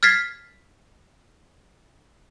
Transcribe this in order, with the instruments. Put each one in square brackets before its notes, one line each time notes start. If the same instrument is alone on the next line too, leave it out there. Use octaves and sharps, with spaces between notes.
[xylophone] F6 G#6 A6 B6 C7